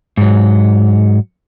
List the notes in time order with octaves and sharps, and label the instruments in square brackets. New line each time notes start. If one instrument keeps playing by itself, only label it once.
[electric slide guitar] G#2 F#3